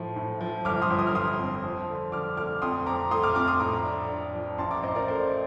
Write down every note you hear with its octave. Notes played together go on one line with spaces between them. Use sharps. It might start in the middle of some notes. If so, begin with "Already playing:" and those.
Already playing: A2 F3
A2
F3
G1 D6 F6
C6 D#6
G1
D#6
F6
G1 C6 D#6
F2
F3
D3
D3 D6 F6
A3 D6 F6
F2 C6 D#6
F2 A#5 D6
A3 C6 D#6
D6 F6
F2 D6 F6
C6 D#6
A2 A#5 D6
D4
D4
F3
A1 A5 C6
A#5 D6
A1 C5 D#5
A#4 D5
A3 C5